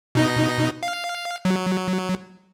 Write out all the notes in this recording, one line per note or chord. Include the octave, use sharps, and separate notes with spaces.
B2 D#4 D#5
F5
F#3